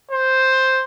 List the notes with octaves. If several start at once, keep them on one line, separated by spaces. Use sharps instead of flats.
C5